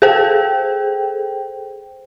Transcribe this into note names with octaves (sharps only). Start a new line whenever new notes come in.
G#4 A4 C5 G5